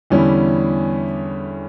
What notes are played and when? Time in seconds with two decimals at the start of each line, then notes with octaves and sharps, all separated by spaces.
0.10 E2 D3 G3 C#4 E4